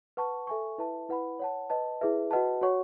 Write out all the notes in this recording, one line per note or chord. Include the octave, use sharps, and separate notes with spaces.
B4 F#5 A5 C#6
A4 E5 G#5 C#6
E4 B4 E5 A5
E4 B4 F#5 B5
C#5 F#5 A5
B4 D#5 A5
E4 G#4 B4 E5
F#4 B4 D#5 F#5 A5
F#4 C#5 F#5 C#6